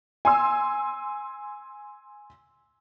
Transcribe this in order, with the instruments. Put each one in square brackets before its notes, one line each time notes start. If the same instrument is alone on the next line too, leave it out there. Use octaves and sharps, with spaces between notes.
[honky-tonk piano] G#5 C6 E6